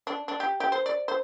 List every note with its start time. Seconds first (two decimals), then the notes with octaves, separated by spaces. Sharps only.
0.07 D4
0.28 D4
0.40 G4
0.60 G4
0.72 C5
0.86 D5
1.08 C5